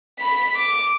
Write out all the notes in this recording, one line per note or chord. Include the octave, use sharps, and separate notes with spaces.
B5 B6
D6